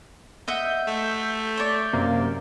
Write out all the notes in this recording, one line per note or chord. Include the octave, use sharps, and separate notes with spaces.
D#5 E5 F#5 G6
A3
C#5 D5
F#2 C3 A#3